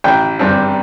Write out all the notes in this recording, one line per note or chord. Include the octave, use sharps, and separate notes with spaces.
A1 G5
G2 G3 C4